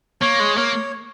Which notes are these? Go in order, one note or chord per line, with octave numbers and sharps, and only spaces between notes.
A#3 C#5
G#3
A#3 C#5